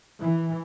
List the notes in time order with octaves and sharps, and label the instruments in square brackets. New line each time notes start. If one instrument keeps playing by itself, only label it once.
[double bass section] E3